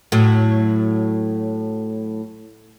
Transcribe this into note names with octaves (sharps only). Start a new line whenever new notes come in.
A2 F#3